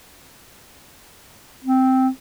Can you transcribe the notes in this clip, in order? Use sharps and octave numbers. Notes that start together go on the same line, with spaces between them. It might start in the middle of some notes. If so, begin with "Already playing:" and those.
C4